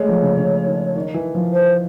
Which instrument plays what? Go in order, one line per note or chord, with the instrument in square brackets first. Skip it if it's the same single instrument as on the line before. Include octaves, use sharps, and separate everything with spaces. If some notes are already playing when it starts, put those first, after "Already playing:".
Already playing: [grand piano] G#3 A3 [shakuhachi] C#5
[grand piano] F3
C#3
C#3
D#3
D#3
E3
F3
[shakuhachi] C5